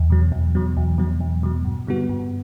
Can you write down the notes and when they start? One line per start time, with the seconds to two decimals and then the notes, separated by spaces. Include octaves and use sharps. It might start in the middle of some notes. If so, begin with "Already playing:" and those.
Already playing: E2
0.10 B2 F#3
0.32 E2
0.55 B2 F#3
0.77 E2
0.98 B2 F#3
1.20 E2
1.43 B2 F#3
1.65 G2
1.87 D3 G3 B3 F#4
2.09 G2